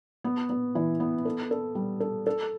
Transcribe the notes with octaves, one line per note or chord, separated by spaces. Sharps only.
B3
B3
E3
B3
A4
A4
G3
A4
A4